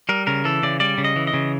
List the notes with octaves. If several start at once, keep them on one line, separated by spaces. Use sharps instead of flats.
G3 A#4
C#3 A#4
E3 A4
C#3 D5
G3 D5
C#3
D#5
E3
D#5
C#3